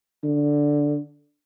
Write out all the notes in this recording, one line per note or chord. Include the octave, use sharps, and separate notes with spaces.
D3